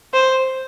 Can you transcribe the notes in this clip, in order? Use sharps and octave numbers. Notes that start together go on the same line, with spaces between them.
C5